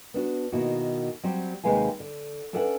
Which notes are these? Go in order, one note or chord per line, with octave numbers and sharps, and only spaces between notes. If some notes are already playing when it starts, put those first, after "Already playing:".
B3 D4 F#4
B2 D#3 A#3 E4 F#4
F#3 G3 C4 G4
D#2 C3 G#3 B4 F5 G#5
D3
C#4 D4 A4 B4 E5 F#5